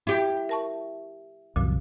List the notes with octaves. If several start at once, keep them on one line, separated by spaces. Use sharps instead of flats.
E4 G4
A#4 A5 C#6
C2 F#2 A#2 D3 F3